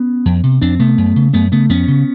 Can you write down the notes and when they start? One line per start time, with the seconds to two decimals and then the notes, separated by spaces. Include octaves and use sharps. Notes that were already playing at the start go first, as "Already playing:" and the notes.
Already playing: B3 C#4
0.26 F2
0.43 C3
0.62 F2 C4 D4
0.79 C3 A3 B3
0.98 F#2
1.16 C#3
1.33 F#2 A3 B3
1.52 C#3 A3 B3
1.69 F2 B3 C#4
1.88 C#3